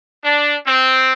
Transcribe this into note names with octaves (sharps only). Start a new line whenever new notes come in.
D4
C4